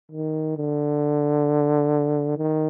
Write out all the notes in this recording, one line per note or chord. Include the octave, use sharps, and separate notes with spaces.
D#3
D3
D#3